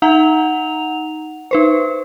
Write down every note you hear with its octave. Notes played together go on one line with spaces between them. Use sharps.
D#4 F#5 A#5 F7
D#4 B4 C5